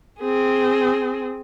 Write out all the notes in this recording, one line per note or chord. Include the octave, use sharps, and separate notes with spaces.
C4 G#4